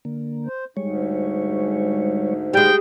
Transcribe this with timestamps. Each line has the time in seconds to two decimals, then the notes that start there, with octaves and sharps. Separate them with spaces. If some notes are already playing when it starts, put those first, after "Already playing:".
0.05 D3 A#3
0.46 C5
0.77 D2 G#2 G3 G#3 C#5
2.54 G3 G#3 G5